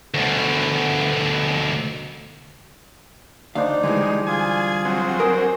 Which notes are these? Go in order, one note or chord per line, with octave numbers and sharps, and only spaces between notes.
D2 B2
D2 D4 D#4 C5 D5 F5
D3 E3 G3 G#3
F4 G#4 G#5
F#3 C4
G#4 A#4 C5